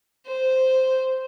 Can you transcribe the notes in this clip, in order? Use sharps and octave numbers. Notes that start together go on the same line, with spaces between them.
C5